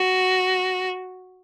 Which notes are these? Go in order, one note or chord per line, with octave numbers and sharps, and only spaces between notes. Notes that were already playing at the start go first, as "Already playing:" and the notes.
Already playing: F#4